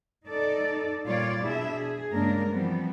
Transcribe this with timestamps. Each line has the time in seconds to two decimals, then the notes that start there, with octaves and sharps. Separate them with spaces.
0.28 D#4 A4 D5
1.04 A#2 G3 F4 C#5 D5 F5
1.43 B2 D4 E4 G#4 E5
1.74 G#4
2.12 G2 C#3 G#3 A#3 D4 A#4
2.53 E3 F3 G3 B3 C4